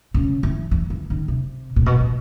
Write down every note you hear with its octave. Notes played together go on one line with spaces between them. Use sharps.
C#3
E3
E3
E3
D#3
C3
A#2
B2
A#2